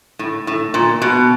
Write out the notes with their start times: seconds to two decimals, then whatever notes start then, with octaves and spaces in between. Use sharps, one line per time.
0.19 A2
0.47 A2
0.74 A#2
1.02 B2